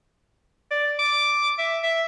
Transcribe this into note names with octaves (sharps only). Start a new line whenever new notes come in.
D5
D6
E5
E5